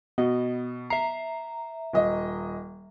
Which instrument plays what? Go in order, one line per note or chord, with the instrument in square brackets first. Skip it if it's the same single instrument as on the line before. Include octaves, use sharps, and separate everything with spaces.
[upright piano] B2 [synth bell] B3 D#5
[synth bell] E5 A#5 [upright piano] C7
[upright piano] D#1 D#5